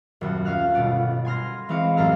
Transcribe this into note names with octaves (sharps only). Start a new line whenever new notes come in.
D#1 F#2 F#5
C#4 F5 F6 F#6
G1 B2 D5 F#5
G#5 C6 F6 A#6
E3 G#3 C4 F5 C#6
A1 F#2 A4 F5 A#5 F6